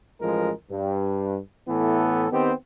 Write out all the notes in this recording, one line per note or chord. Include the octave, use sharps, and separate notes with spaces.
A1 F3 G#3 A#4
G2
A2 E3 B3 A4
D#3 B3 C4 G4